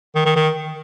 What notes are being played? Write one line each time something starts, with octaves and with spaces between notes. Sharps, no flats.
D#3
D#3
D#3